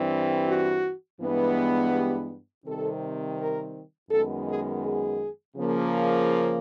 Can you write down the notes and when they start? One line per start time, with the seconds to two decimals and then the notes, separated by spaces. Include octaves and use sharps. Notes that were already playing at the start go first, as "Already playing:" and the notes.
Already playing: G2 E3 G3 C4
0.47 F#4
1.20 G2 E3 G#3 B3
1.93 G4
2.64 C3 D#3 G3 C4 A4
3.38 A#4
4.10 F#2 D#3 G#3 B3 A4
4.47 G#4
4.83 G#4
5.56 C#3 F3 A#3